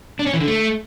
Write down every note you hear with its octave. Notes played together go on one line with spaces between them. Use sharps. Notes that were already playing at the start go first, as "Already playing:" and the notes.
D4
C#4
E3
D3
A3